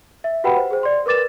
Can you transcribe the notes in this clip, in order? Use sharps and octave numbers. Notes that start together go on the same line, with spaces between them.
E5
F#4 G4 B4 F#5 G5 B5
C5
G#4 C5
D5 C6
A#4 B4 D6 A6 E7